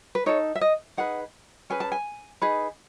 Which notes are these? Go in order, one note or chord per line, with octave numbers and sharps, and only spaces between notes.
B4
D#4 A4 C#5
E5
D#5
D#4 G#4 B4 F#5
C#4 G#4 B4 G#5
A5
G#5
D#4 G#4 B4